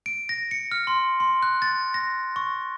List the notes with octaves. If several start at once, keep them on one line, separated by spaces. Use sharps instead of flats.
D7
A#6
C#7
F6
C6
C6
F#6
A6
A#6
C#6